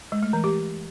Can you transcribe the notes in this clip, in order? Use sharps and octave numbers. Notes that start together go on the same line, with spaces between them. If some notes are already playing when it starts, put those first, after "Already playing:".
G#3
A3
E3
G4